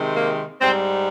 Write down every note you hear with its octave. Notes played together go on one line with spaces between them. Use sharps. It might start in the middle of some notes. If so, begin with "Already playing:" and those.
Already playing: C3 D#3 G#3
A#3
G#2 G3 C4